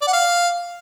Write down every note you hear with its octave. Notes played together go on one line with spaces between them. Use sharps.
D5
F#5
F5